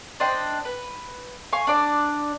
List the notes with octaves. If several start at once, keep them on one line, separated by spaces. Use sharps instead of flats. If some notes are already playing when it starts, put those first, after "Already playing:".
D4 C5 D#5 G5
B4
F5 G#5 C#6
D4 D5